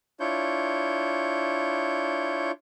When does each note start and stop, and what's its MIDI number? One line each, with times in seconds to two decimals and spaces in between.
0.20 2.51 62
0.20 2.51 64
0.20 2.51 65
0.20 2.51 73
0.20 2.51 91